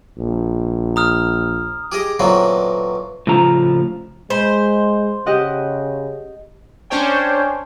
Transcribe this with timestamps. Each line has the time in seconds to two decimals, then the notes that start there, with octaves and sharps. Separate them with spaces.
0.18 A#1
0.96 A#5 D#6 F6
1.92 G4 G#4 D#5 G5
2.19 A#2 D3 E3 F#3 B3 C4
3.27 A2 C#3 F3 A#5
4.30 G#3 C5 B5
5.26 C#3 G4 D#5 F#5
6.90 C#4 D4 C5 C#5 G5